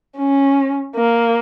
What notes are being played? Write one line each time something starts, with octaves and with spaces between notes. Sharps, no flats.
C#4
A#3